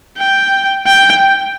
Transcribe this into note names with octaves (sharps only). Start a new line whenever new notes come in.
G5
G5